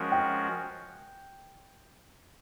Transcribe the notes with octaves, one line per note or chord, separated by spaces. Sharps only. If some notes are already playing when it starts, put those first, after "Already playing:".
Already playing: F3 G#3 C#4 F#4 A#4
G5